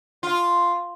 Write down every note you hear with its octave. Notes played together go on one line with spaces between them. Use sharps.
F4